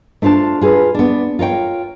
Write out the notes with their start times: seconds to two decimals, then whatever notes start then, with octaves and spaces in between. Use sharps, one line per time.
0.22 A3 D4 F4 C5 A5
0.61 F4 G#4 B4
0.95 B3 D4
1.39 F4 A#4 C#5 G5